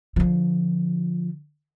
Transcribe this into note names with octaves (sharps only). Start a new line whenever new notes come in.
D3 F3